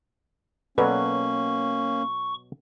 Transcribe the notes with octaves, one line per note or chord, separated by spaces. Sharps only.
B2 F#3 A#3 C#4 A4 B4 D5 C#6